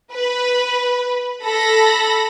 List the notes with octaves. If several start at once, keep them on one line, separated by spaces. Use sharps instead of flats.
B4
A4 B5 A#6